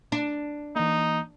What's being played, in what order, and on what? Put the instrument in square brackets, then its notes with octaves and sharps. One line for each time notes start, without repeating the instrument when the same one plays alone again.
[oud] D4
[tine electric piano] E3 A#3 [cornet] D#4